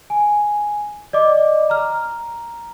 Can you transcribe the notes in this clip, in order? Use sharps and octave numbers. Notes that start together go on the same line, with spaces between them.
G#5
D5 D#5 D6
A#5 F6